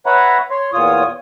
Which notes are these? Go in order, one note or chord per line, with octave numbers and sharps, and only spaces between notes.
B4 C#5 E5 F#5 A#5 B5
C#5 C6
E2 A#2 F4 C#5 D#6